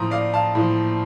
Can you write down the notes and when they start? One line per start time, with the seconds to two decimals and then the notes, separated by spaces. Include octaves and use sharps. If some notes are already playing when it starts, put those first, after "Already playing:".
Already playing: A2 F3 A#5 C6 D#6
0.11 D5 F5
0.34 F5 A5
0.55 A2 F3